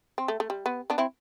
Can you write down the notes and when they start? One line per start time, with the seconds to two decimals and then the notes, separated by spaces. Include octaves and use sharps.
0.18 C4
0.28 A3
0.40 A3
0.50 G3
0.66 B3
0.90 B3 D4
0.98 C4 E4